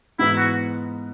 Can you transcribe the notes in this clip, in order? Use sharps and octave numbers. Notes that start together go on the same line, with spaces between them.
G#2 E3 B3 E4
F#4